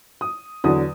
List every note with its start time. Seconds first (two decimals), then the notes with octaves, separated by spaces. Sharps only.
0.21 D#6
0.64 E2 D3 F#3 D#6